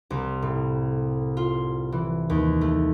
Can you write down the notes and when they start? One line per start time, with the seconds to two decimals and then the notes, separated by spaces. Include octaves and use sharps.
0.10 C2
0.42 A2
1.37 F4
1.92 E3
2.30 D#2
2.61 A3